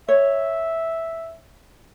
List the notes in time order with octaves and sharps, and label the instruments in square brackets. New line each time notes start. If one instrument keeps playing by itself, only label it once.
[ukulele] C#5 [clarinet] E5